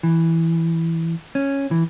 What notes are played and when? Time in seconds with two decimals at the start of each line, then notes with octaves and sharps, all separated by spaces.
0.03 E3
1.35 C#4
1.71 E3